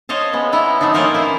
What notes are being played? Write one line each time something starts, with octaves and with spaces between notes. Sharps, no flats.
C5 C#5 D#5 F5 A5
G#3 B3 C#4
G3 B3 E4 A#5
F#3 A3 C4 D4 D#4
A#3 C#4 D#4 F4 A#4 C5
E4 C5